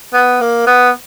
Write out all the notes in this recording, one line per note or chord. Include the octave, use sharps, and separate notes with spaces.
B3
A#3
B3